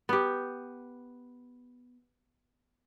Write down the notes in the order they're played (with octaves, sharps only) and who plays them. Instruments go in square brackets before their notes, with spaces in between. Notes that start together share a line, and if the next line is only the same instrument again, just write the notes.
[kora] B3 G4